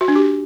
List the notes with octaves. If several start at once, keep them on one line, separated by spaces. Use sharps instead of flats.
F#4
D4
G4